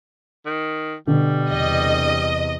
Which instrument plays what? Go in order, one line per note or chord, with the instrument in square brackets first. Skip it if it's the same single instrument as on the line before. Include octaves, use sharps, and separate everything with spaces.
[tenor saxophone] D#3
[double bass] B2 [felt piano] D3 [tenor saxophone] G3
[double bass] E2 C3 [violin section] D#5